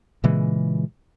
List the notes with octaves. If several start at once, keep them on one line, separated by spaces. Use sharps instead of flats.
A#2 C#3 E3 G#3